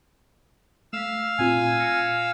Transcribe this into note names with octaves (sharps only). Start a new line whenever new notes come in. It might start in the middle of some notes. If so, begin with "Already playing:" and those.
A3 F5 E6 B6
A#2 C4 F4 G#5
F6 A#6 C#7